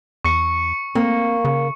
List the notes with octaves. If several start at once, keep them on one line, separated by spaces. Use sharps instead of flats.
E2 C#6 C#7
A#3 C4
C#3